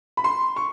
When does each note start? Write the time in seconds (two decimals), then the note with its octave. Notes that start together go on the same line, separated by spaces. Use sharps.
0.17 B5
0.24 C6
0.56 C#6